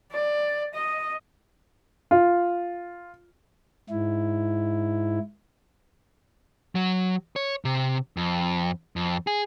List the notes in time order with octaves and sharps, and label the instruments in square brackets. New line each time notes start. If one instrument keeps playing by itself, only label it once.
[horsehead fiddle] D5
D#5
[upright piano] F4
[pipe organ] G#2 E4
[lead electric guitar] F#3
C#5
C3
F2
F2
G#4